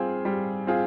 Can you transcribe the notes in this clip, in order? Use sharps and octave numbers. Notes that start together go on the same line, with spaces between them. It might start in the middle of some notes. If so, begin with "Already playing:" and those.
Already playing: G3 C4 F4 G#4
G3
C4 F4 G#4